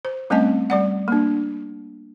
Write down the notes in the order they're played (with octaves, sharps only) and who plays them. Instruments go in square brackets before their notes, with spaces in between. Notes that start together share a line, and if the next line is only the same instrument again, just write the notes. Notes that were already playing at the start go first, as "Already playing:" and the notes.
[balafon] C5
G3 A3 C4 C#4 D#5 A5
G3 D5 F#5
A#3 D4